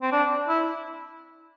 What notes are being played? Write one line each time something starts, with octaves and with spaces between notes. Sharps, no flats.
C4
D4
E4